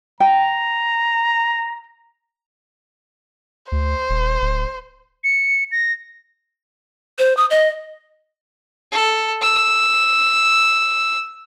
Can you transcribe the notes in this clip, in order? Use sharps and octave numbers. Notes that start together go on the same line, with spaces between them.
G5 A#5
D2 C5
D#1
D1
C#7
A#6
C5
D#6
D#5
A4
E6